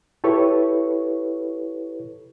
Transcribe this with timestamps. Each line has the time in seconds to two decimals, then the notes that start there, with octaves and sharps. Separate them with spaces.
0.24 E4 G4 A4 B4 C#5 C#6